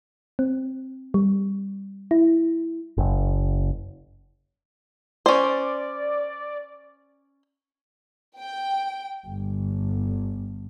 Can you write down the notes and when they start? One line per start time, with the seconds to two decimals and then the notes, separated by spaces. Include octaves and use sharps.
0.39 C4
1.14 G3
2.11 E4
2.97 F#1
5.26 C#4 C5 D5
8.36 G5
9.25 G1